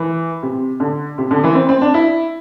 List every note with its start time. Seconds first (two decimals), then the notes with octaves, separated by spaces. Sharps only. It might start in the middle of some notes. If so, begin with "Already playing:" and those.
Already playing: E3
0.43 C3
0.80 D3
1.18 C3
1.31 D3
1.44 E3
1.55 C4
1.69 C4
1.81 D4
1.94 E4